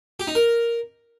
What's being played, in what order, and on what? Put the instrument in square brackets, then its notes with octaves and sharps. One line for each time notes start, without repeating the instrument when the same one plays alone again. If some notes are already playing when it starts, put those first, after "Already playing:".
[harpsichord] G4
D#4
A#4